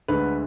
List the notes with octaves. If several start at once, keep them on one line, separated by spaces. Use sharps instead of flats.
D2 D3 G#3 B4